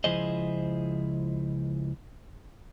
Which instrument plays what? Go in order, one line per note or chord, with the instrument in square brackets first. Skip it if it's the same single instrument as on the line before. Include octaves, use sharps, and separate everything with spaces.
[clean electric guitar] C#2 F3 E4 G#4 C5 D#5